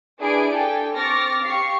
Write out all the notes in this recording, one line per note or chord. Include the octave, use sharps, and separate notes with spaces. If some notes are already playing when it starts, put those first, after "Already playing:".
D4 E4 G#4 B4 G#5 D7
G4 A4 G5 G#5
C4 C#6 D6 F6 A6 A#6
G4 F5 C#6 C7